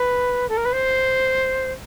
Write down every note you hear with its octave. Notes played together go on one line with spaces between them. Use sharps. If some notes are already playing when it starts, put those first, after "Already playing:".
Already playing: B4
A4
A#4
B4
C5